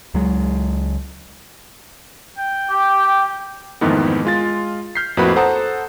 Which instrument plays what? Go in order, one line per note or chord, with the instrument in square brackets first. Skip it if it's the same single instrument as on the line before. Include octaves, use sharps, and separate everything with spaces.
[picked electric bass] C#2 F#3 G#3
[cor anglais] G5
[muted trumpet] G4
[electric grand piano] F2 G#2 D#3 E3 A3 B3
G#3 F4 A6
F6 G6 B6 C7
F2 A2 A#3 F#4 B4 B5
A4 C5 F#5 A5 A#5 D#6